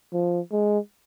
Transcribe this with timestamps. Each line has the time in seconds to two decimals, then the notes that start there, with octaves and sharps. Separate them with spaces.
0.13 F3
0.52 G#3